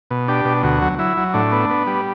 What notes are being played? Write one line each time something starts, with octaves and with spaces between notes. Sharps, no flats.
B2
D4 G4
B2
D2 F#4
F#3
F#3 E4
F#3
A2 D4
B3
B3
G3